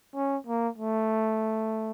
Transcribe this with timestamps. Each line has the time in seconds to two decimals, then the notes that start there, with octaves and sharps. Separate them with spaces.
0.16 C#4
0.47 A#3
0.78 A3